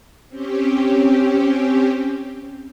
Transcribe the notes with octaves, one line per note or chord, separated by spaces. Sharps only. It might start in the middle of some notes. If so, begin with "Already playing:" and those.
C4 C#4 G4